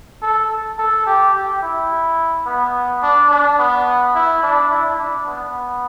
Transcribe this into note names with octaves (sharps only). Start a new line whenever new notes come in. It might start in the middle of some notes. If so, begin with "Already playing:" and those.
A4
A4
G4
G4
E4
B3
D4
D4
B3
E4
D4
E4
D4
B3